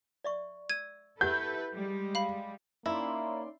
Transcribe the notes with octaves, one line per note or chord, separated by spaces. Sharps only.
D5 E5 C#6
E6 G#6 D#7
E4 G4 A4 B4 F#5 G6
G3 G#3
F5 B5
A#3 C#4 D#4 E4 D5 E5 C6